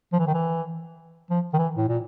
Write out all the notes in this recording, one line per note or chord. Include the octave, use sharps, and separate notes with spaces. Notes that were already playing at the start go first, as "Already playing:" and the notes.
F3
E3
D#3
E3
F3
D#3
E3
A2
A#2